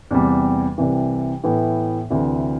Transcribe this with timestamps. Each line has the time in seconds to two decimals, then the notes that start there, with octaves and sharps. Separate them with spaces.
0.11 E2 C3 G3
0.78 C2 C3 E3
1.44 A2 E3 B3
2.10 D2 C3 E3